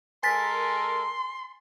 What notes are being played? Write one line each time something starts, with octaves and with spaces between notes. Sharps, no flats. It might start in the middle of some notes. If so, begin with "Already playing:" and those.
G#3 A4 A#4 G#5 C6 A6 B6